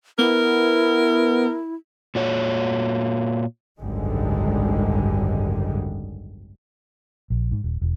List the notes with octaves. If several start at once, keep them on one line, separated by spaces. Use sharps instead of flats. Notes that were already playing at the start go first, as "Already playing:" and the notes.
B3 E4 A#4
A#2 F#4 C#5
G#1 C#2 F#2 D3 G3 G#3
A#1
G#2
D#1
E1